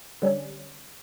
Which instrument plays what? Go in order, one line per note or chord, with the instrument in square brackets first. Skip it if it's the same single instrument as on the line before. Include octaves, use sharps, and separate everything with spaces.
[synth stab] D3 G3 C#4